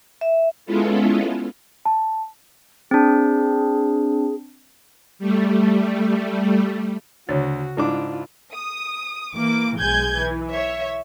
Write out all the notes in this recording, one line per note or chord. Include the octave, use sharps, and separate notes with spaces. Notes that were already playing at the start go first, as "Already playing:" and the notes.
E5
G#3 B3 C#4 E4 F4 A4
A5
C4 D4 G#4
G3 A3
D2 C#3 F#4 C#5 A6
G#2 D4 E4 F4 D6
D#6
E3 A#3 D6
B1 G#3 G#5 G6 G#6
E3
C#5 E5